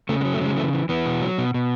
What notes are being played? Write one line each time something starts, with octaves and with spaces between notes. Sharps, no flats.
C#3 A3
G#3
F#3
A3
C#3 G#3
E3 A3
E3
E3 B3
B2
F#3
B2
B2